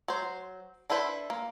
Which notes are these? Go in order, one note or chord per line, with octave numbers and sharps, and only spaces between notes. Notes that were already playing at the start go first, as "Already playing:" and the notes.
F#3 C5
D4 E4 A4 B4 C5
A#3